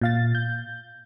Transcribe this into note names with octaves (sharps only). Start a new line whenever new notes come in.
A#2 F5 A6
G6